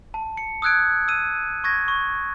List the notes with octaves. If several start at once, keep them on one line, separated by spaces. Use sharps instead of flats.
A5
C#7
D#6 E6 F#6 G#6 D7
E6 D#7
C#6 G#6 A#6
C#6